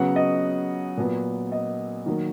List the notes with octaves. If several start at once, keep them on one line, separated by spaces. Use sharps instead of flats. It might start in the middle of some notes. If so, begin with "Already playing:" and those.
Already playing: C#3 F#3 B3 F#5
D#5
A#2 F#3 B3
D#5
D#3 F#3 A#3